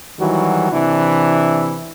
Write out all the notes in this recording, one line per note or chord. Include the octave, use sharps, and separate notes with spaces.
D#3 E3 F#3 G3 F#4
C3 E3 D4 E4